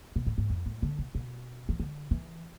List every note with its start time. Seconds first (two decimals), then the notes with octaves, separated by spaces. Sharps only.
0.16 B2
0.27 A2
0.38 G#2
0.50 F2
0.66 A2
0.82 D3
0.99 B2
1.15 B2
1.69 E3
1.80 D3
2.11 E3